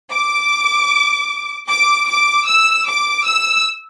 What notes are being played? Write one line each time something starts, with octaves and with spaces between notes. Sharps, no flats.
D6
D6
D6
E6
D6
E6